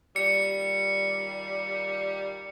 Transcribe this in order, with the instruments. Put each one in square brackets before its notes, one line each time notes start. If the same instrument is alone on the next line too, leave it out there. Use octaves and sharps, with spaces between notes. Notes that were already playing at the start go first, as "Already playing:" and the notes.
[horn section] A#2 D#3 G3 [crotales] C#7